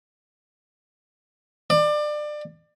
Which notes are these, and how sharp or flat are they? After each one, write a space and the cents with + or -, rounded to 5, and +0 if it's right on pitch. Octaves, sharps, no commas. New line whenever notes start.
D5 +25